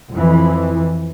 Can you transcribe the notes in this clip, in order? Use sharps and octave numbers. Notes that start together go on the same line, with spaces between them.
F2 E3